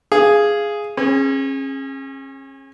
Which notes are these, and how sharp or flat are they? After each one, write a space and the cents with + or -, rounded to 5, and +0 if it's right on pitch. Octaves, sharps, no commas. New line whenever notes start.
G#4 +0 F5 -15
C#4 -35 G#4 +0